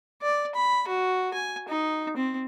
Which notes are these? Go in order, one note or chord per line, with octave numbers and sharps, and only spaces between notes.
D5
B5
F#4
G#5
D#4
C4